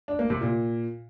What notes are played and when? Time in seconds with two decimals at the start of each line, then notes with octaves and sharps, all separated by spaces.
0.08 D4
0.19 A#3
0.30 C3
0.41 A#2